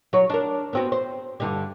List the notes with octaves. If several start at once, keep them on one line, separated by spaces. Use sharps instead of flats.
F#3 C#5
D4 A#4
B3 C4 F#4
C5
G2 D3 G3